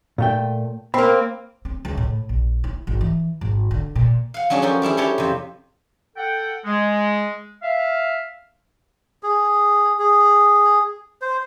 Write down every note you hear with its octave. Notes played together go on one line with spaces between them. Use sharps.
A#2 A3 G5
A#3 C4 B5
C4
C#2
A2
A#1
E4
G#1
E3
G#1
D3
A#2
F5 F#5
F#3 C#4 D4 F#4 G#4
F3 C#4 F#4 A4 A#4 G5
G3 D4 E4 G#4
C#4 D4 E4 G4 A4 C#5
F2 C3
A4 F#5 G5
G#3
E5 F5
G#4
G#4
C5